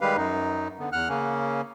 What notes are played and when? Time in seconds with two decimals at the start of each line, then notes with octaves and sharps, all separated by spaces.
0.01 D#3 G3 G#3 G4 B4 F5
0.17 F#2 D#4
0.79 D3 B3
0.92 E2 F#5 F6 F#6
1.09 C#3 A#3 C#4